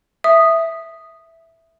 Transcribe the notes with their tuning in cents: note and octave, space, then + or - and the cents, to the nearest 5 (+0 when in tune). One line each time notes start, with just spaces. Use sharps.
E5 +0 D#6 -5